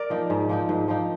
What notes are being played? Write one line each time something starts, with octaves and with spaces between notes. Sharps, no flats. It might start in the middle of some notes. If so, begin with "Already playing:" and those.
Already playing: A#4 D5
F3 A#3 D#4
G#2
F3 A#3 D#4
G#2
F3 A#3 D#4